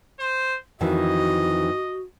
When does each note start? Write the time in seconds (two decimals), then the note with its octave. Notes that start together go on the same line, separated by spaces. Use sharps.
0.20 C5
0.81 F2 D#3 E3 F#4 D#5